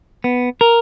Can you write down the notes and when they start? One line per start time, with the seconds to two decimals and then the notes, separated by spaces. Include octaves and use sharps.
0.24 B3
0.61 A#4